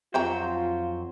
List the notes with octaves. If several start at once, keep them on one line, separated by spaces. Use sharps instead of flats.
F2 F#3 C4 F4 C5 G5 A#5